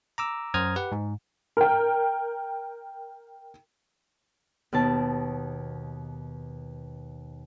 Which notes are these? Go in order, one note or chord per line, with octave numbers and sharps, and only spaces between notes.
A#5 D6 E6
F#2 C5 A#5 D#6 F6 G#6
G4 B4 F#5
G#2
A#4 G5
D#2 B2 A5